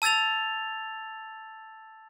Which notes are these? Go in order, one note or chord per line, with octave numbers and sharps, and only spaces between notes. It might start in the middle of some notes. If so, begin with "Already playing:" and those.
A5 E6 G#6 A6 F7